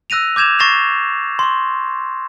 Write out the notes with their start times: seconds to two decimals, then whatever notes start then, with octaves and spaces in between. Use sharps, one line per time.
0.10 E6 F#6 A#6 D#7 F7
0.36 D6 G6 G#6 E7 F7
0.59 C#6 A6 A#6 C7 E7 F7
1.39 C6 C#6